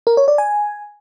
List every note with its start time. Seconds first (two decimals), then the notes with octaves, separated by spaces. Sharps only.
0.07 A#4
0.17 C#5
0.28 D5
0.38 G#5